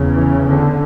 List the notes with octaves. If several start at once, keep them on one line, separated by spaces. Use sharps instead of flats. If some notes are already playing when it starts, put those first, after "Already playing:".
Already playing: E2 C#3
E3
D3